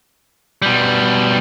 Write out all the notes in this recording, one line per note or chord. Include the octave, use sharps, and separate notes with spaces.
B2 G3